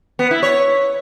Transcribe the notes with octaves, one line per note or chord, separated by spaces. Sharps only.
B3
E4
C#5